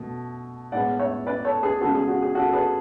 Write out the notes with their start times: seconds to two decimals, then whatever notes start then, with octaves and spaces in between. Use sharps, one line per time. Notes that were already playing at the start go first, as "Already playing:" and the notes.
Already playing: B2 A3
0.72 A2 G#3 B3 D5 F#5
0.99 C#5 E5
1.27 B4 D5
1.45 A4 C#5
1.63 G#4 B4
1.81 C#3 G#3 B3 F#4 A4
1.95 G#4
2.08 F#4
2.22 G#4
2.35 F#4 A4
2.48 A4
2.53 G#4 B4